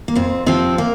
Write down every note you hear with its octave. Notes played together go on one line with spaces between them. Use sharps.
A#3
F2 C4
C3 F3 C4
A#3